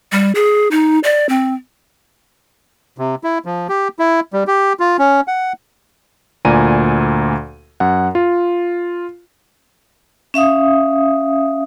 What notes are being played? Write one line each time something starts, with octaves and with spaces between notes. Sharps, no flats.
G3
G#4
D#4
D5
C4
C3
E4
F3
G4
E4
G3
G4
F4
C#4
F#5
D2 A#2 D5 G#5 A#5 D#7
F#2 F#5
F4
C#4 E5 F5 D#6